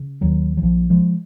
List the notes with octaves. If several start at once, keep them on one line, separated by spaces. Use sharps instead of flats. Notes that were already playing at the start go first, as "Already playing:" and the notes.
Already playing: C#3
D#2 D#3 F#3
F#3
A#1 F3
F3 G#3